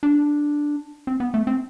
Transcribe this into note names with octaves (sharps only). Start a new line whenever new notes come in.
D4
C4
B3
A3
C4